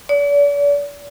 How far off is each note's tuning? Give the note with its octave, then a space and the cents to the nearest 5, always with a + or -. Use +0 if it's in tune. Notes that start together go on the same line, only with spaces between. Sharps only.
D5 -40